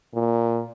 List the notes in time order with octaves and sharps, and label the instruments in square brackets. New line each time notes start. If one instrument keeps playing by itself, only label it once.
[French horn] A#2